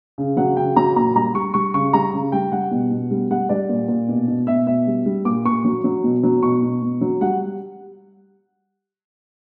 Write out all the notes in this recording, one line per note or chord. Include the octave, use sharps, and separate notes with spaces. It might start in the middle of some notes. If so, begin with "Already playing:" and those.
C#3
F#3 F#5
C#3 G5
F#3 A#5
A#2 A#5
G3 A#5
G3 C#6
G3 C#6
C#3 C#6
G3 A#5
C#3
G3 G5
G3 F#5
B2
B2
G3
G3 F#5
G3 D5
A#2
A#2
B2
B2
B2 E5
B2 E5
G3
G3
A#2 D6
A#2 C#6
F#3
F#3
B2
F#3
B2 C#6
B2
B2
F#3
G3 F#5